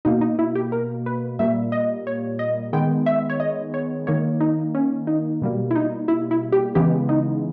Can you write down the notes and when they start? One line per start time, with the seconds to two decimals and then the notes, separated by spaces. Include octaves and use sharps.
0.05 B2 A#3 D#4
0.21 D#4
0.39 E4
0.55 G4
0.72 A#4
1.06 B4
1.39 A#2 G3 A#3 E5
1.72 D#5
2.07 C#5
2.39 D#5
2.73 D#3 G#3 B3 G5
3.06 E5
3.30 C#5
3.40 D#5
3.74 C#5
4.07 D#3 A#3 C#5
4.40 D#4
4.75 C#4
5.07 D#4
5.42 B2 G3 A#3
5.71 E4
5.75 D#4
6.08 E4
6.31 E4
6.52 G4
6.75 C#3 E3 G#3 B3 G4
7.09 D#4